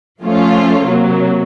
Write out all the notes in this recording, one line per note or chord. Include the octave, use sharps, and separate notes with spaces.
F3 A3 C#4 F4
C3 F#3 A#3